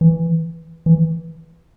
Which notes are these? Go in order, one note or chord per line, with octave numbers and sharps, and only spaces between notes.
E3
E3